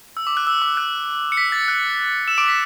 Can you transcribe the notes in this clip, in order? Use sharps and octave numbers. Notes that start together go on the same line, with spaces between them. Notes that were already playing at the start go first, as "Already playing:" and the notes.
E6
D6
F#6
E6
D6
F#6
C#7
B6
A6
F#6
E6 E7
D6 D7
B6